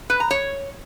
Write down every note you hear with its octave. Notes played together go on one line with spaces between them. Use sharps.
B4
A#5
C#5